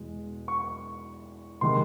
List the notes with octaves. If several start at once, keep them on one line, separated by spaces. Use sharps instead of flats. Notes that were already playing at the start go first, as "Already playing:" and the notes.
Already playing: E2 B2 G#3
C#6
C3 D#3 G#3 C6